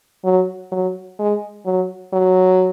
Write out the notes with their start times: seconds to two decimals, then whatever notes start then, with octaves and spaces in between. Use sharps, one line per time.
0.24 F#3
0.72 F#3
1.19 G#3
1.66 F#3
2.13 F#3